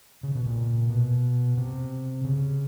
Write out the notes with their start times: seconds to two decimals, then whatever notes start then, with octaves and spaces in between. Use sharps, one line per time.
0.23 C#3
0.35 B2
0.46 A#2
0.90 B2
1.57 C3
2.24 C#3